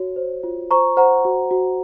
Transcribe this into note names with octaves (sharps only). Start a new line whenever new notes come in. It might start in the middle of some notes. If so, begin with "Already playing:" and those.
Already playing: F#4 C#5
C5
F4
C5 A#5 C#6
C5 F#5 A#5
F#4
F#4